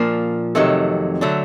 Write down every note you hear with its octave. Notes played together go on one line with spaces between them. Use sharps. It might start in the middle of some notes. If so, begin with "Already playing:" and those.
Already playing: A#2 F3 A#3 D4
F2 C3 D#3 F#3 A3
D3 F#3 A3 D4